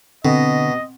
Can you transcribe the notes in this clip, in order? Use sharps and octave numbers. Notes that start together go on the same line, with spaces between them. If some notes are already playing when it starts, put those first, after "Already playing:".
B2 D3 C4 D#5